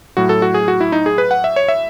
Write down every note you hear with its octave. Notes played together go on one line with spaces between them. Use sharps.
A2 F#3 F#4
A4
F#4
G#4
F#4
E4
D#4
G#4
B4
F#5
E5
C#5
E5